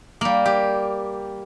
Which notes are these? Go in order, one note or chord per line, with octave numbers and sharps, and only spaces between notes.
G3 A#3
G4